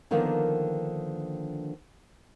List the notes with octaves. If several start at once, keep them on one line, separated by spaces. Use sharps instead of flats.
D3 D#3 F3 A#3 B3 D4